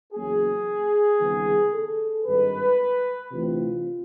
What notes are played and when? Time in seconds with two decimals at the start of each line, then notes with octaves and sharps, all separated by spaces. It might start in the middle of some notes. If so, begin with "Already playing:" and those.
0.13 E2 C#3 F#3 A#3 C#4 G#4
1.20 C#2 C3 D#3 G3 B3
1.73 A4
2.25 G#1 G2 D#3 G#3 B4
3.31 D2 C3 E3 A3 C4 F4